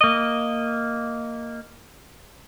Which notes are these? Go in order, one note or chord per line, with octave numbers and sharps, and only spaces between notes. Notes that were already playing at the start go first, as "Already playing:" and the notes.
A#3 D#5